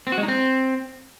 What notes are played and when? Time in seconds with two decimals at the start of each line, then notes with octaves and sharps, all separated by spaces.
0.07 C4
0.12 F#4
0.18 G#3
0.23 D#4
0.28 C4